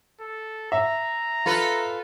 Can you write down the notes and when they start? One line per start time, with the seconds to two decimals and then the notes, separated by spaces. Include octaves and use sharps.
0.21 A4
0.72 E5 A#5
1.46 F4 A4 B4